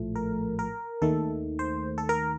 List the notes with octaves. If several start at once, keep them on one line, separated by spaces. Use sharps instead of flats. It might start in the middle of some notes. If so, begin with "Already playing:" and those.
Already playing: A#1 A2 F3 A3
A#4
A#4
D#2 D#3 A3 A4
C5
A4
A#4